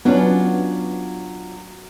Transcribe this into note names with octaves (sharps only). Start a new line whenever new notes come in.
F#3 B3 C#4 D4 F4